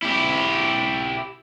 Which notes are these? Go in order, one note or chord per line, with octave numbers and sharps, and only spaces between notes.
E4 G4